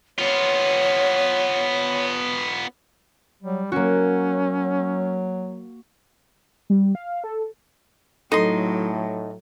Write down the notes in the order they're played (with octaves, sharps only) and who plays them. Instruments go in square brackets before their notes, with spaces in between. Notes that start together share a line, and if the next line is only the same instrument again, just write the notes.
[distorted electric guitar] B3 F4 [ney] C#5
[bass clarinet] F#3 [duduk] G3
[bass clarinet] F#3 [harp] A#3 F#4 [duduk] C#4
[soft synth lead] G3
F5
A4
[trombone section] A2 [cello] F#3 [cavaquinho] D#4 C6 [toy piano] A4